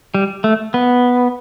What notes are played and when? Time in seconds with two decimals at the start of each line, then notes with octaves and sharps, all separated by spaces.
0.14 G3
0.44 A3
0.74 B3